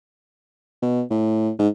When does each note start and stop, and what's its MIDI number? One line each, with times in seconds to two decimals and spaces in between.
0.82 1.02 47
1.11 1.51 45
1.59 1.68 44